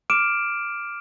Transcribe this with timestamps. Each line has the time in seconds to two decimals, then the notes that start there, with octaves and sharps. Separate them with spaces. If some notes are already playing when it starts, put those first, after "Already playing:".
0.10 D6 F6 D7 E7